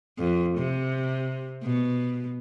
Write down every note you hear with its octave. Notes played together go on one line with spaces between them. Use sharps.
F2
C3
B2